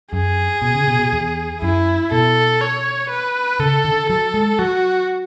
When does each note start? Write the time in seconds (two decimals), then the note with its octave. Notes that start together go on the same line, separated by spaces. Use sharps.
0.13 F#2 G#4
0.62 B2
0.75 C#3
0.87 B2
0.99 B2
1.13 E2
1.61 F#2 E4
2.12 B2 A4
2.61 C#5
3.10 B4
3.60 C#3 A4
3.85 D3
4.10 F#3 A4
4.34 G#3
4.59 F#3 F#4